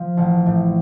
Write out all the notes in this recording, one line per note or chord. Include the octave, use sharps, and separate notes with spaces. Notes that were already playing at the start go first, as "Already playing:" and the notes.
Already playing: F3
A1
A2